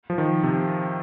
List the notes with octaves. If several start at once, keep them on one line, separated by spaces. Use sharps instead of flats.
F3
D#3
C3